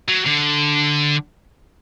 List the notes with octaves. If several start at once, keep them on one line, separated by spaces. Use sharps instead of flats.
F#3
D3